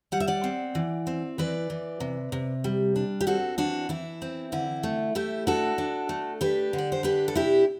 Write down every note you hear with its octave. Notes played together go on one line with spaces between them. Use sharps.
G3 F#5
E5
D5 F#5
C4
E3
C4
E3 B4 D5
E3
C3
C3
G3
D4
G4
C4 F#4 A4
E3 D4 F#4
E3 E4
C4
D3 E4
A3
A3 E4 G4
D4 F#4 A4
D4
A3
D4 G4 B4
D3
D5
C5
D4 G4 B4
A4
C3 E4 G4